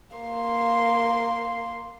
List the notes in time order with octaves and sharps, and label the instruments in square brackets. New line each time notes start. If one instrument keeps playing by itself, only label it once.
[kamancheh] A#3 C6